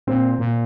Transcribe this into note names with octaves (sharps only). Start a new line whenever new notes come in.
A#2 C4
A#2